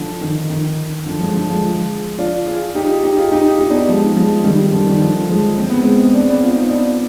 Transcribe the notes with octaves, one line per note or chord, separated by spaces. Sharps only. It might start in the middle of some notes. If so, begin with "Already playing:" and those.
Already playing: D3 F3
D#3
D#3
D3 F3
F3 G#3
D3 F3
F3 G#3
D4 F4
F4 G#4
D#4 G4
D#4 G4
F4 G#4
D#4 G4
D#4 G4
B3 D4
F3 G#3
F3 G#3
D#3 G3
D3 F3
D#3
D3 F3
F3 G#3
C4
B3
G#3 C4
D4
C4
B3 D4
D4 F4
C4 D#4
B3 D4